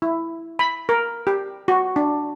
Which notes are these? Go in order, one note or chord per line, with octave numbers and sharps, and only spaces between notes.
E4
B5
A#4
G4
F#4
D4